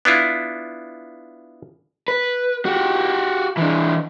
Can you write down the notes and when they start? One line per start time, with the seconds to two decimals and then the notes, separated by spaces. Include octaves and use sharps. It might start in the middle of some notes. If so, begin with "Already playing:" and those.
0.05 B3 D4 E4 F4
2.08 B4
2.65 F#4 G4
3.57 E3 D4